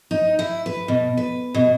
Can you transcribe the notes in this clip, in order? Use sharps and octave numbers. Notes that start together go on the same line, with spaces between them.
D#4
E4
B4
B2
B4
B2